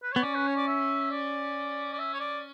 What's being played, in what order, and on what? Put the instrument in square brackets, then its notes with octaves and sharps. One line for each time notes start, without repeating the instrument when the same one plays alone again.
[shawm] B4
[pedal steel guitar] B3 [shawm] C#5
[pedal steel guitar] C#4 [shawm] D5
[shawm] B4
C#5
D5
E5
D5
D5
E5
C#5
D5